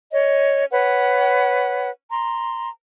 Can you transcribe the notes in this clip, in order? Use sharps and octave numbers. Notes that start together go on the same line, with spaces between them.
C#5 D#5
B4 C#5 F#5
A#5 C6